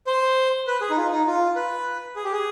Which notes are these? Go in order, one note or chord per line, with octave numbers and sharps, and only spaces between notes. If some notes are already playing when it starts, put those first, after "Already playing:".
C5
B4
G#4
D#4
F4
D#4
F4
B4
G#4
G4
G#4